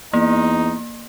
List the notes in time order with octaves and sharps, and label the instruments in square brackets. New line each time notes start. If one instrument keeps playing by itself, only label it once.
[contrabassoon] E2 [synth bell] A#3 [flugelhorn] D#4